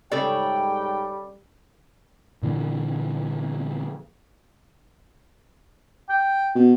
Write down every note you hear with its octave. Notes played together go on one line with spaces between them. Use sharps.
G#2 C#3 G3 A4 C#5 D5 G5
A#2 D3 E3 A#3
G5
B2